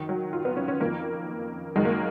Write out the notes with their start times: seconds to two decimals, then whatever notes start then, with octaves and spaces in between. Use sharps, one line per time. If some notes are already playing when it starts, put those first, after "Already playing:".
Already playing: F#2 D#3
0.09 F#3
0.33 F4
0.45 B3
0.57 C#4
0.68 C#4
0.81 F2 D#3 A#3
1.76 F#2 D#3 G#3
1.85 A#3